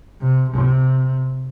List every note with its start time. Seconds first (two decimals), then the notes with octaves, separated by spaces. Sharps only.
0.21 C3
0.50 C3